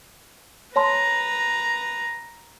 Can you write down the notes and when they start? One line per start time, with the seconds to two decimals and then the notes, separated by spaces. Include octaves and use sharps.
0.76 B4 C#5 A5 A#5 C6